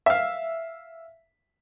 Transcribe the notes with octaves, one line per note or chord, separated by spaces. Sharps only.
E5 F5